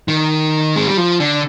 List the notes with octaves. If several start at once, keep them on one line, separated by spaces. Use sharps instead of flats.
D#3
G#3
G3
F3
D3